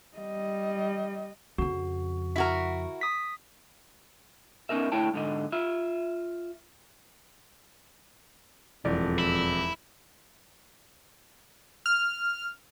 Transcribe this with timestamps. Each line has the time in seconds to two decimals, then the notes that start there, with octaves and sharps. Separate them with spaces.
0.17 G3 D#5
1.58 F2 C#3 F#4
2.36 E4 F#4 A#4 B6
3.01 D#6 B6
4.69 B3 C#4 D#4 A#4 E5
4.92 D3 A3 E4 C#5 G5 A5
5.14 G#2 D3 D#5
5.52 F4 E5
8.85 E1 F2 A2 D5
9.18 E4
11.86 F6